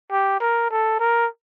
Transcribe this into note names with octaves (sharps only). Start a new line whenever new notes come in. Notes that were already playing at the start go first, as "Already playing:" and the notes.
G4
A#4
A4
A#4